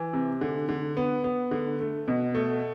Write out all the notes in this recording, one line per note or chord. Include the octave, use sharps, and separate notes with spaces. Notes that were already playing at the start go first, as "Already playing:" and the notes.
Already playing: E3
C3
D3
D3
B3
B3
D3
A3
B2
A3